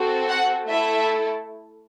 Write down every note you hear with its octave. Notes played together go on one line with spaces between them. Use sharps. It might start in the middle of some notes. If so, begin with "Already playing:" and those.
Already playing: C4 F#4 A4
F#5
A3 E4 A4 E5